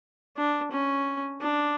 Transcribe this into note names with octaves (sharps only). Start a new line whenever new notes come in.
D4
C#4
D4